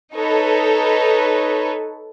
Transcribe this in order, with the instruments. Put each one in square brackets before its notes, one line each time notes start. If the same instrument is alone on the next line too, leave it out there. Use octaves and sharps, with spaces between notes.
[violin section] D#4 A4 B4 C#5